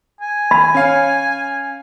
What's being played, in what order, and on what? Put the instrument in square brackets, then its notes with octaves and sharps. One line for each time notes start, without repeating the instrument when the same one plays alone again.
[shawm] G#5
[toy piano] B5
[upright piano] C#4 F5